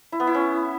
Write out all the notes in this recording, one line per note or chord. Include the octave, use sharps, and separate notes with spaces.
E4
B3
E4
C#4